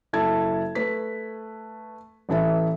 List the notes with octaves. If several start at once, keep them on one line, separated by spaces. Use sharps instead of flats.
F#1 E4 A4 A5 G#6
A3 B4 B6
A1 E3 A4 E5